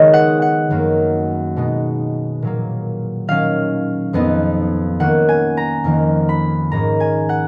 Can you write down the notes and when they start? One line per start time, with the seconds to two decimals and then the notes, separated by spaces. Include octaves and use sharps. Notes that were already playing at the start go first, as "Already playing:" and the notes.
Already playing: D#3 G#3 B3 D#4 C#5 D#5
0.13 F#5
0.42 F#5
0.71 F#2 D#3 A#3
1.56 B2 G#3 B3 D#4
2.42 A#2 F#3 A#3
3.28 D#3 F#3 C#4 F5
4.13 F2 F3 B3 D#4
5.00 D#3 A#3 C#4 F#5
5.29 G#5
5.57 A#5
5.84 F2 D#3 A#3
6.29 B5
6.72 G#2 D#3 A#3 C#4 A#5
7.00 G#5
7.29 F#5